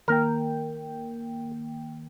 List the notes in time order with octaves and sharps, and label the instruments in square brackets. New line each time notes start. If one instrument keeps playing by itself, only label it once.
[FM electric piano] D#3 A#3 G5 [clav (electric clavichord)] A#4